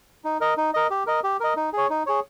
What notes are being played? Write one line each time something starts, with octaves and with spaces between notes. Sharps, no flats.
D#4
A#4 D#5
D#4
A#4 D#5
G4
A#4 D#5
G4
A#4 D#5
D#4
G#4 C#5
D#4
G#4 C#5